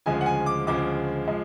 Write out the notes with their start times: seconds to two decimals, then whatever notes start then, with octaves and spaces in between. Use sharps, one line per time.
0.06 D2 C#3 F3 G#3 G#5
0.21 F#5
0.26 G#5
0.46 D6
0.67 D2 C#3 F3 G#3 D6
1.28 F3 G#3